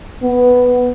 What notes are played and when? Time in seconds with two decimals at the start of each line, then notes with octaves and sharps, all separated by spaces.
0.22 B3